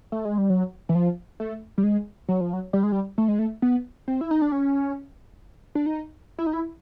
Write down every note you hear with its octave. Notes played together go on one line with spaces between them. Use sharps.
A3
G#3
G3
F#3
E3
F3
A3
G3
G#3
F#3
F3
F#3
G3
G#3
G3
A3
G#3
A3
B3
C4
E4
D#4
D4
C#4
D4
D#4
E4
D#4
E4